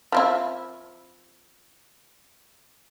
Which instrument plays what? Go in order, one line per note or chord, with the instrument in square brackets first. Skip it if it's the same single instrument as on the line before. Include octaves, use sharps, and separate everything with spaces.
[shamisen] F3 C4 E4